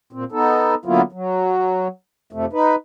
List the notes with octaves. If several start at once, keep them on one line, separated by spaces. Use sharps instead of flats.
A#2 C4
B3 D#4 A4
D3 F#3 A#3 B3 E4 F4
F#3
F2 C3 A3
D#4 B4